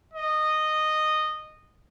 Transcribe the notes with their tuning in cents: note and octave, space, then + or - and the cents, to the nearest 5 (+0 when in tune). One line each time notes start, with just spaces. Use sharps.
D#5 -10